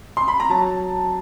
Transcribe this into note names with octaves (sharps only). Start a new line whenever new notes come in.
C6
B5
A#5
F#3 A5